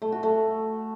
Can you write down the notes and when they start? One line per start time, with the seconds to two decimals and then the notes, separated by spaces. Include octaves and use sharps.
0.02 A3
0.12 F#4
0.23 A3